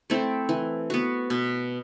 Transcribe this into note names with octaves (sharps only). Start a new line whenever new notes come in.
A3 C4 E4
E3
B3 F#4
B2